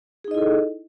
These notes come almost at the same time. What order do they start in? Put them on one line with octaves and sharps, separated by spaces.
G#4 D#4 D#5 E4 A4